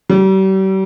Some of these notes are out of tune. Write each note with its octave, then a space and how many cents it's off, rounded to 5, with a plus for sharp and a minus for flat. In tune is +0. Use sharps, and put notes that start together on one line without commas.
G3 -40